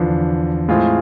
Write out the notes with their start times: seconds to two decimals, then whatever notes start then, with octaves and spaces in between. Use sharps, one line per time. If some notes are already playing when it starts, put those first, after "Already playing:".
Already playing: E2 D3 F3
0.68 A2 G#3 C4 F4 G#4